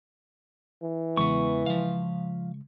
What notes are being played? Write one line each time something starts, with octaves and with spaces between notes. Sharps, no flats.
E3
E2 C#3 G#3 B3 C#6
F3 F5